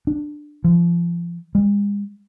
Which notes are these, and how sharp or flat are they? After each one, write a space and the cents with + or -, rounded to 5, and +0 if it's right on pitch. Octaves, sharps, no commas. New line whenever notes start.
D4 +15
F3 -30
G#3 -40